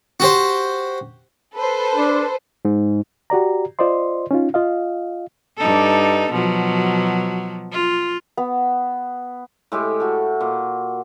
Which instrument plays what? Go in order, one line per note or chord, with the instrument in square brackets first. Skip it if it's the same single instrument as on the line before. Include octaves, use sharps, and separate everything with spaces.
[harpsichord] F#4 G4 C5
[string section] A4 B4 C5
[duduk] D4
[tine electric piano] G#2
[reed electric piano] F#4 G4 D5 A#5
F4 C5 D5 D#5 C6
C#4 D#4 F4
F4 D#5 F5
[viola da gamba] G2 D#4 A4
B2 F3 F#3
F4
[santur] B3
[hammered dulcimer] A2 G#3 G4
F#4 A4
A#2